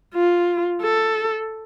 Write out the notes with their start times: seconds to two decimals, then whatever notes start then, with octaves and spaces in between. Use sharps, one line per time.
0.15 F4
0.82 A4